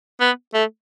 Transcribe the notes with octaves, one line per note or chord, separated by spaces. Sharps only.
B3
A3